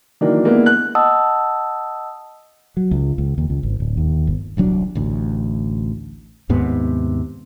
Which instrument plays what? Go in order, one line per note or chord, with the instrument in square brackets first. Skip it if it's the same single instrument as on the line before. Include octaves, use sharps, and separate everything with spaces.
[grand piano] D#3 E3 F#3 A#3 D4
G#3 A#3 B3 D4 E4
F#6
[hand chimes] D#5 F#5 A5 D#6 E6
[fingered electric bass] F#3
C#2
C#2
D#2
C#2
G#1
D1
D#2
G1
[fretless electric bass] D#1 C2 F#3 D4
A1 D2
D#2 G#2 C3 B3